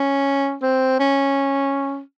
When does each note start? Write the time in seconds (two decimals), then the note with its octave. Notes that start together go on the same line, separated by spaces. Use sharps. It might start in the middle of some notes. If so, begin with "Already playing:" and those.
Already playing: C#4
0.62 C4
0.99 C#4